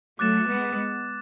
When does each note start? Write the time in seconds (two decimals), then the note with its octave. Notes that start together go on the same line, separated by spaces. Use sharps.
0.19 F#3 A3 D6 F#6 A6 E7
0.48 G#3 B3